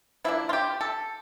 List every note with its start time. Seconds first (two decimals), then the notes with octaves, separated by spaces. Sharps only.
0.24 F3 A#3 D4 E4
0.49 F4
0.53 G4
0.81 A4